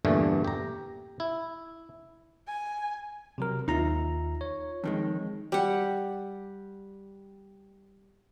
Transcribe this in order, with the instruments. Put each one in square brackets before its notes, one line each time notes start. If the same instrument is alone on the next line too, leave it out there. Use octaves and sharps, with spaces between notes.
[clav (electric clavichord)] E2 G2 A#2 D3 E3 A3
G4 A#5
E4
[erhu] G#5
[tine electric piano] C3 F#3 A#4
[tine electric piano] D#2 A#5 [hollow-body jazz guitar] D#4 F4 E5
[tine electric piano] C#5
[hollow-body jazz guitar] F2 D#3 G#3
[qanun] G3 F#5